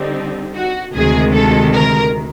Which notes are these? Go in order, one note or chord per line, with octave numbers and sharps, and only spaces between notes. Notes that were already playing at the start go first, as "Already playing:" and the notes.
Already playing: D3 G3 C4 D#4
F#4
D2 C3 D#3 G#3 G#4
A4
A#4